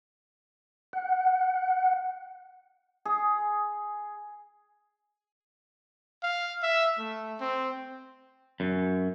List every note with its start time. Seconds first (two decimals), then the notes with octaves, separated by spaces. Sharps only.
0.93 F#5
3.05 G#4
6.23 F5
6.63 E5
6.98 A3
7.41 C4
8.60 F#2